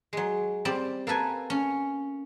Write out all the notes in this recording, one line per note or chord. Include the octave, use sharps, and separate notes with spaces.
F#3 G#3
G3 C4 D5 C6
A#3 A4 B4 G#5
C#4